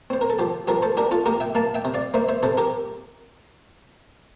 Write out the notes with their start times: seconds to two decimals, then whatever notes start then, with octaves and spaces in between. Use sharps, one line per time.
0.10 C4 C5
0.21 A#4
0.30 A4
0.39 F3 G4
0.68 F3 G4 A#4
0.82 A4 C5
0.97 D4 G4 A#4
1.11 F4 A4
1.26 A#3 G4 A#4
1.40 E5 G5
1.55 A#3 F5 A5
1.75 E5 G5
1.85 C3
1.94 D5 F5
2.14 A#3 C5 E5
2.28 C5 E5
2.43 C3 A4 C5
2.57 G4 A#4